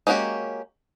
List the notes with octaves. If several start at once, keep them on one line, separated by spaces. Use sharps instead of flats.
G#3 A#3 C#4 F#4 G4